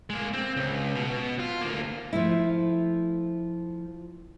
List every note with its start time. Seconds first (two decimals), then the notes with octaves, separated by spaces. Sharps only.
0.10 G#3 A#3
0.33 C4
0.57 C#2
0.95 B2
1.40 F4
1.61 D2 A#3
2.13 F3 A3 E4